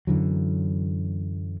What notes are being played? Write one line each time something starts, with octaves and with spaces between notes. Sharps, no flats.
F#2 D3 E3 F#3